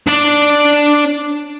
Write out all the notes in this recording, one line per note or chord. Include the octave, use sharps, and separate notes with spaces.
D4 D5